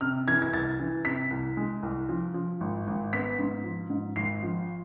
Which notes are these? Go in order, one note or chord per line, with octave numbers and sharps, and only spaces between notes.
C3 F6
E3 G#6
G#6
C2 A6
E3
C3 B6
C2
G#3
C2
F3
F3
G#1
G#1
B3 B6
G#2
F3
G#2
G#1 C7
F3